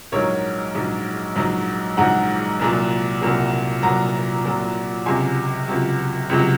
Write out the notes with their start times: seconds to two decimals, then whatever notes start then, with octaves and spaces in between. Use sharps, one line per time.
0.12 A#1 G#2 F#3 A#4 C#5
0.75 A#1 G#2 F#3
1.35 A#1 G#2 F#3
1.97 A#1 G#2 F#3 F#5 A#5
2.60 C2 A#2 F#3
3.21 C2 A#2 F#3
3.83 C2 A#2 F#3 F#5 A#5
4.44 C2 A#2 F#3
5.06 C#2 C3 F#3 G#5 C6
5.68 C#2 C3 F#3
6.29 C#2 C3 F#3